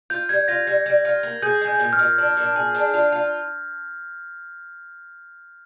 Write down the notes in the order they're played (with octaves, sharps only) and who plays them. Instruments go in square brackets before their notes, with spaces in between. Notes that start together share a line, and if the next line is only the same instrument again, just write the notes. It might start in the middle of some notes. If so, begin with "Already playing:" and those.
[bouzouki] F4 [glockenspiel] G6
[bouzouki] G3 [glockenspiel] G#6
[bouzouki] F4 [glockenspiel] A#6
[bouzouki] G3
G3
F4
A#3
[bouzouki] G#4 [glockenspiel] G6
[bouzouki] G#3
[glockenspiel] G6
[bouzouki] A#2
[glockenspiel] F6
[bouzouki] A#2
D4
A#2
G#4
D4
F4
F4